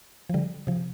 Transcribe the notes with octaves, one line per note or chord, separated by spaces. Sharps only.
F3
D3 G3
C3 F3